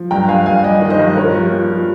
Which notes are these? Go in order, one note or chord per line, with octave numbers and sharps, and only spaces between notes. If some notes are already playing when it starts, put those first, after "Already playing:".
Already playing: F3
G2 G5 A#5
G2 F5 G#5
G2 F5 G#5
G3 D#5 G5
D#3
C5 D#5
G2
F3 A#4 C#5
F3
F3
F3